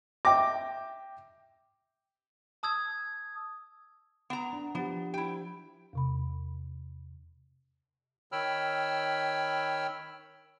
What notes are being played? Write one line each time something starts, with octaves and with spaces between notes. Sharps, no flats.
E5 G5 D6 A#6
A5 D#6 E6 G#6
B3 A#5
D4
F3 B3 G4
E4 G4 G5
E2 C3 B5
D#3 C#5 G5 B5 E6 F6